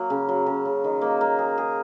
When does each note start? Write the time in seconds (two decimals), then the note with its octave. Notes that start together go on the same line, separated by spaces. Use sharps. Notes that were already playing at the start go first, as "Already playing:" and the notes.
Already playing: F#3 A#3
0.10 C#3
0.29 F#3
0.46 C#3
0.65 C#3
0.84 D#3
1.01 A#3
1.21 A#3
1.39 G#4
1.58 G#4